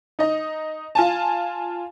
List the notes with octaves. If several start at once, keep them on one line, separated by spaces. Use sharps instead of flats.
D#4 D#5
F4 G#5 A5